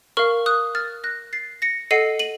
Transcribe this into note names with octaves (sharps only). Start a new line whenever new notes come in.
A#4 F5 C#6 F6
D#6 F#6
F6 A6
F#6 A#6
A6 C7
A#6 C#7
A4 D#5 F#5 C7 D#7
D#7 F#7